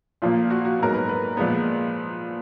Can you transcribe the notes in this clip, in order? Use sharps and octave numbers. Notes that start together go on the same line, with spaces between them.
A#2 F3 A#3 F4
F#4
F#4
G#2 F#3 B3 A#4
B4
B4
A#2 F3 G#3 B3